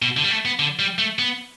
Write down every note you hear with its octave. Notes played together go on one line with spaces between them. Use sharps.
B2
D3
G3
A3
B3
D3
G3
A3
B3